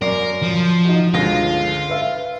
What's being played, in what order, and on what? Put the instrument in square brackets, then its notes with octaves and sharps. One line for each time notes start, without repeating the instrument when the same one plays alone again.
[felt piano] F#2 D5 C7 [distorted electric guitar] A#4
[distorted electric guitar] F3
[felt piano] D#4 F#4
[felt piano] G1 C#2 A#6 [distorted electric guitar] F4
[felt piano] B4 E5 F5